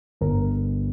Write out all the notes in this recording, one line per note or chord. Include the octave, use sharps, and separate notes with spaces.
G1 A#4